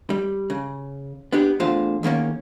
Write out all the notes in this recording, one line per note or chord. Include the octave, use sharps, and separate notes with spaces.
G3
C#3
B3 D4 G4
E2 A2 D3 F4 C5 F5
E2 D#3 A#3 C#4